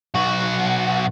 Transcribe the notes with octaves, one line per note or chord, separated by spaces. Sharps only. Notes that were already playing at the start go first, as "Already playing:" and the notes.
B1 F#4